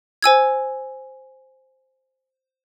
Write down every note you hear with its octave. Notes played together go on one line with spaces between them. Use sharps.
C5 G#5 E6 G#6